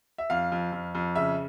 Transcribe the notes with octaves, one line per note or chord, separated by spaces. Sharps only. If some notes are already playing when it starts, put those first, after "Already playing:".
E5
F2 F5
F2
F2
F2
C#3 E5